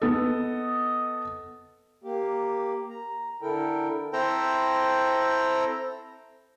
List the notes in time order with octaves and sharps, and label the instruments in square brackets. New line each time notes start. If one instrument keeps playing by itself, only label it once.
[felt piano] B3 A4 [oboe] D#5
[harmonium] A#3 G4
A#5
D3 E4 A4 A#4 G5
[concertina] C4 E4 A4 C5 G5 A#5